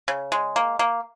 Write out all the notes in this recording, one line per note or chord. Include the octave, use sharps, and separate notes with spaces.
C#3
G#3
A#3
A#3